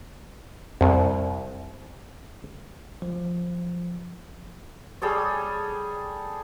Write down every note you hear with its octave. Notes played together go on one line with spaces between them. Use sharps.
C2 F2
F3
G3 G#4 A4 C#5